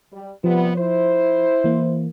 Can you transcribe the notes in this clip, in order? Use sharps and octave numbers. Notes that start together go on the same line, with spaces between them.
G3
C3 F3 G3 B3
E4 C5
E3 A#3